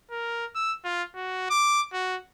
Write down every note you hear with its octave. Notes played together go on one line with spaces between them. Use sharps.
A#4
E6
F4
F#4
D6
F#4